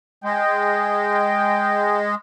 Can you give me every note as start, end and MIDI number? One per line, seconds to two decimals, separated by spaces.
0.24 2.15 56
0.24 2.01 79